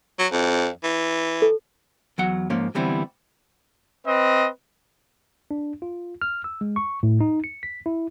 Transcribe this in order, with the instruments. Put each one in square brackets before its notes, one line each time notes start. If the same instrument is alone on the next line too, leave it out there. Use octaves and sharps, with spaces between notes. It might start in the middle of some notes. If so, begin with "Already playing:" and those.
[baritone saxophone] F#3
F2
E3
[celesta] A4
[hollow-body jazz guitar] E2 F#3 F#5
G#2 F3 A#3 C#4
D3 E3 G3 B3 C4 E4
[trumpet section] C4 B4 D#5
[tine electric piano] D4
F4
F6
E6
G#3
C#6
A2
D#4
C#7
B6
E4